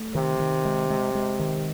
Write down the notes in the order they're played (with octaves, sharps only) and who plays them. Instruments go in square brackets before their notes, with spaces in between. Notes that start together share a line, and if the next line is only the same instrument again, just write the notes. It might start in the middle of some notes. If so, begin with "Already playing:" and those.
Already playing: [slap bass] A3
[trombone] C3 [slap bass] D#3
[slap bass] D#3
G#3
G#3
G#3
D#3